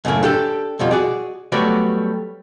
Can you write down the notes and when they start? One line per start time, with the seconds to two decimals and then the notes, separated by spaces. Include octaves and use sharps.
0.05 F#2 A2 C#3 G3 A3 A#3
0.23 D4 G4 A4
0.79 F2 B2 G3 F4
0.91 F#4 G#4 D5
1.52 F#3 G3 A3 B3 F#4 D5